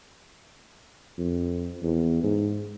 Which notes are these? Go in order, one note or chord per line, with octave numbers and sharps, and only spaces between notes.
F2
E2
G#2